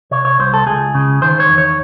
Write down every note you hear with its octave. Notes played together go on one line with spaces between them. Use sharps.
C3 C#5
C#5
C2 C5
A4
C#2 G#4
C#3
D#3 C5
C#5
E2
C#5